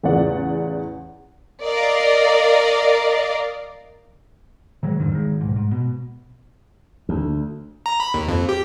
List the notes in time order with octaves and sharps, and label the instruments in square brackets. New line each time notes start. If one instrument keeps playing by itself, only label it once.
[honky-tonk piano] A1 E2 C#3 F4 D5 F#5
[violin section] A#4 D5 D#5 F5
[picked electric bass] D#3 F#3 G#3
F2 G#2 D3 D#3
D#3 G#3
B1 G#2
G#2
B2
[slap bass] D2
[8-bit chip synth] A#5
B5
D#2
F2
G4